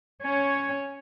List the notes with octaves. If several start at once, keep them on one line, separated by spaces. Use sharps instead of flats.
C#4 C#5